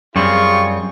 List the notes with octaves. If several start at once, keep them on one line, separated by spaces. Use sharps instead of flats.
F#2 G3 C4 F4 G#4 C#6